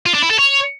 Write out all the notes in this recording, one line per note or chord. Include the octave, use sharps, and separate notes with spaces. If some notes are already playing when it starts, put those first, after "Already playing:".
F4
D4
E4
A4
C#5